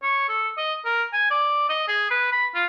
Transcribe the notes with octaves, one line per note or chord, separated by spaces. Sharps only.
C#5
A4
D#5
A#4
G#5
D5
D#5
G#4
B4
B5
F4